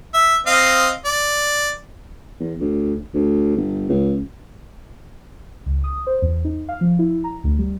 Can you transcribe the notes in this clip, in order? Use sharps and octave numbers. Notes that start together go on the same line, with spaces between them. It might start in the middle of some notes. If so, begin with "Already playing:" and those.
E5
C4 D#5 F5
D5
E2
D2
D2
G1
C#2
C#2
D#6
C5
E2
D#4
F5
F3
E4
A#5
D2
G3